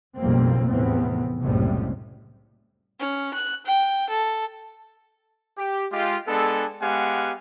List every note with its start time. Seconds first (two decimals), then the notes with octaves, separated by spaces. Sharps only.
0.17 F#1 B1 F2 G3 A#3 C4
0.69 F1 E2 A2 B3 C4
1.40 F#1 C2 A2 C3 G3 G#3
3.00 C#4
3.34 F#6
3.66 G5
4.10 A4
5.58 G4
5.92 G#3 F4 G4
6.28 G#3 B3 D4 G#4 A4
6.81 G#3 B3 G4 F5 F#5 G#5